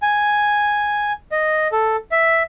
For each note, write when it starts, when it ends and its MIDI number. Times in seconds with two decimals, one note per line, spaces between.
0.02 1.13 80
1.32 1.68 75
1.72 1.97 69
2.12 2.43 76